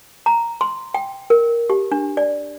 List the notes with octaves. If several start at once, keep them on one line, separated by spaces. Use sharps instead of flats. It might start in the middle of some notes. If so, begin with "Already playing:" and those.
A#5
C6
G5
A#4
G4
D4
D5